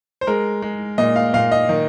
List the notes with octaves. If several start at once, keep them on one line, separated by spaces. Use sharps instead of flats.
C5
G#3 A#4
G#3
A#2 D#5
F5
A#2 F5
D#5
D#3